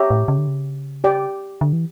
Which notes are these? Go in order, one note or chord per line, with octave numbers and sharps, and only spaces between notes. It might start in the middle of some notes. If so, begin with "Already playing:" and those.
Already playing: G4 C#5 E5 A#5
A2
C#3
D3
C#3
G4 D5 G5
D3
E3